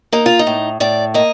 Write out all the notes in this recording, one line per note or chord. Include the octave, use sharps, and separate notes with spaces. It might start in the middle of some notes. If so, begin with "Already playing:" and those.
A#3 D#4
F4
D#4
A2
A2 D5
A#3 D#5